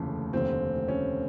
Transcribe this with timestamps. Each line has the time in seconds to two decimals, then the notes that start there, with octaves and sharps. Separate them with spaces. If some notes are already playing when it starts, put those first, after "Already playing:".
Already playing: F1 D#2 C#3 E3 A3
0.33 F1 D#2 D3 C4
0.88 C#4